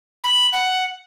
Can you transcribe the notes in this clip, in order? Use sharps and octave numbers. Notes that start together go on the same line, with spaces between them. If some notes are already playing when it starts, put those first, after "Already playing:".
B5
F#5